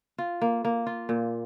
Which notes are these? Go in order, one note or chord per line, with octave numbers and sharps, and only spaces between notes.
F4
A#3
A#3
F4
A#2